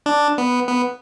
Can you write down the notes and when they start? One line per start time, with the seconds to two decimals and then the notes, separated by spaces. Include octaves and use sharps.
0.06 D4
0.38 B3
0.68 B3